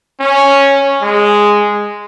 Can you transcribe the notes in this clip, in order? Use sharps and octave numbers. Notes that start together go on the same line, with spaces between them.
C#4
G#3